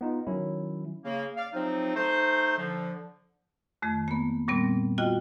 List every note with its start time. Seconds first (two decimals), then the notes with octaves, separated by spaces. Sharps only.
0.01 B3 D#4 F4
0.27 D#3 F#3 C#4 E4
1.04 C#3 A#3
1.37 D5 F5
1.54 C3 F3 F#3 C4 D#4
1.95 A3 D#4 C5
2.57 D3 F3
3.82 F2 D#3 A3
4.08 A#3 B3
4.48 A#2 G3 B3 C4
4.98 F4 F#4 D#5 G5